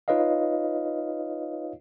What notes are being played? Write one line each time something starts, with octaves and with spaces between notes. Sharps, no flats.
D#4 F4 B4 C#5 D#5 F5